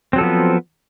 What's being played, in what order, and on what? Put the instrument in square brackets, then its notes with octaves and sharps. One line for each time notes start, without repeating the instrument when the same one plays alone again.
[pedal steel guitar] C4
F#3
A4
F3
B3